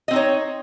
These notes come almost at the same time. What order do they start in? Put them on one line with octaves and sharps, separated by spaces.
D#5 C4 D#4 C#5